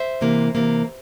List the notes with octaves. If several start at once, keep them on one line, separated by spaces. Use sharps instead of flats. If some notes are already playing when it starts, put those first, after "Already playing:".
Already playing: C5 E5
C3 E3 A#3
C3 E3 A#3